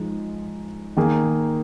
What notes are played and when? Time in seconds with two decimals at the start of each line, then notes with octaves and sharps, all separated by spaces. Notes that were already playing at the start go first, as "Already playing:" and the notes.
Already playing: F3 G#3 D#4
0.97 D#3 A#3 G#4